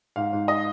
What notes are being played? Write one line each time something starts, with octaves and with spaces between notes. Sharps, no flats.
G#2 F5
G#2
D#5